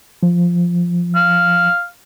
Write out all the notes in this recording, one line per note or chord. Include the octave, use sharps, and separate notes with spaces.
F3
F5